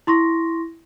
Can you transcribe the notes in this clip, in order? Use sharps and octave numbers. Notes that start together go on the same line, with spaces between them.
E4 C6 C#6 A#6